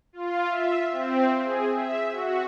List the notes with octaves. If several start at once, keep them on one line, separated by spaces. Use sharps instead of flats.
F4
E5
C4
G#4
E5
F#4